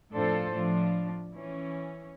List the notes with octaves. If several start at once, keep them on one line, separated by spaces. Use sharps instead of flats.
F2 A2 D4 F4 A4 C5
A2 F3 D4 F4
E3 C#4